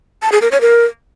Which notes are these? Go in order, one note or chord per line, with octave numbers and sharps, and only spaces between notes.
A5
G#4
A#4
C#5
A#4